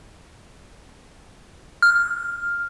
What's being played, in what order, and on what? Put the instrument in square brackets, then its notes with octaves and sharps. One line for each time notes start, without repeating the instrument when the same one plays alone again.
[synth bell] F6